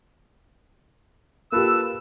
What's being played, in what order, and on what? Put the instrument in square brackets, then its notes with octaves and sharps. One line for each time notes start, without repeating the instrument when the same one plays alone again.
[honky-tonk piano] A#3 F4 G4 [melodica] A4 B4 [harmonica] E6